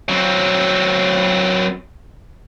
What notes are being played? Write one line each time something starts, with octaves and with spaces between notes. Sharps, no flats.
F#3 C4